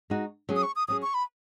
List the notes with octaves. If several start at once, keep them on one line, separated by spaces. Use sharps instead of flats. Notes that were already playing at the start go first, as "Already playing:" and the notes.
G#3 D#4 F#4
F#3 C#4 G#4
D#6
C#6
D#6
F#3 C#4 G#4 D#6
C#6
B5